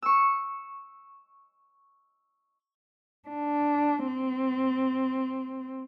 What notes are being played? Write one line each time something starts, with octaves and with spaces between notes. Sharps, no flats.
C#6 E6
D4
C4